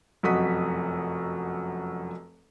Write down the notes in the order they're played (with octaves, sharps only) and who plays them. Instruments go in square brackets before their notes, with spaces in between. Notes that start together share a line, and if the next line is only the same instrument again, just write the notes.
[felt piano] F1 F#2 F#4 D#5 D#6 B6